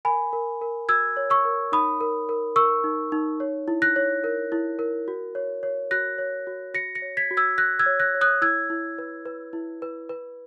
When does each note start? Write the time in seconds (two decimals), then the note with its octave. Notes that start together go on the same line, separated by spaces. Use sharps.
0.05 A#4 G#5 B5
0.33 A#4
0.61 A#4
0.89 F#4 E6 G#6
1.17 C#5
1.30 C#6 E6
1.45 A#4
1.72 D#4 B5 D#6
2.01 A#4
2.29 A#4
2.56 A#4 C#6 E6
2.84 D#4
3.12 D#4
3.40 C#5
3.68 E4
3.82 F#6 A#6
3.96 C#5
4.24 A#4
4.52 E4
4.79 A#4
5.08 F#4
5.35 C#5
5.63 C#5
5.91 F#4 F#6 A#6
6.18 C#5
6.47 F#4
6.74 F#4 A#6 C#7
6.95 A#6 C#7
7.02 C#5
7.17 G#6 B6
7.31 F#4
7.37 E6 G#6
7.58 F#4 F#6 A#6
7.79 E6 G#6
7.86 C#5
8.00 F#6 A#6
8.15 C#5
8.21 D#6 F#6
8.42 E4 E6 G#6
8.70 E4
8.98 B4
9.25 B4
9.53 E4
9.82 B4
10.09 B4